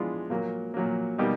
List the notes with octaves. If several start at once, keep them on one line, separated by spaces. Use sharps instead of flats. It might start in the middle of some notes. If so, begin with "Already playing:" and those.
Already playing: E3 G#3 B3 D4 F4
A#2 F#3 A#3
A#2 F#3 A#3
B2 G3 A#3 D#4 G4